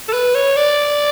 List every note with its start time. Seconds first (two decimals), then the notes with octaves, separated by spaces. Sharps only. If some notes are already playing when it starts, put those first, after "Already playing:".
0.09 A4
0.13 B4
0.35 C#5
0.56 D5